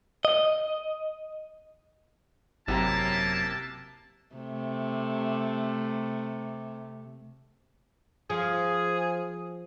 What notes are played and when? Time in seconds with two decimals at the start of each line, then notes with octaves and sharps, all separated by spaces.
0.25 D#5
2.68 G#1 F#2 C3 A#3 E4 F#4 A5 A#5
4.35 C3 A3
8.30 F3 G#4